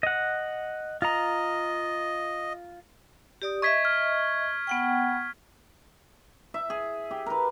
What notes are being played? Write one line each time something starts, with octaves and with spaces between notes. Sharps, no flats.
D#5 F#5
F4 D#5 A#5
G4 D5 D#6
D#5 E5 C#6 G#6 B6
F6
B3 F#5 G5
E5
G#4
G4
A#4 B4